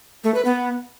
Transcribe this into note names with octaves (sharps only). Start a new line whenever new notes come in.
A3
B4
B3